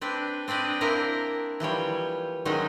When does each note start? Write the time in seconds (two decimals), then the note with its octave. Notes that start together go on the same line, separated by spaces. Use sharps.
0.01 C4 D4 B4
0.48 C4 D4 B4 D5 D#5
0.81 A#3 C4 D4 E4 A#4 A#5
1.60 E3 F3 G3 C#5
2.45 D#3 F#3 G#3 C#4 D#4